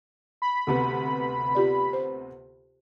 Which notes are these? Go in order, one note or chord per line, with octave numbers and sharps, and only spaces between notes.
B5
D2 C3 B3
F4 G4 D5
C5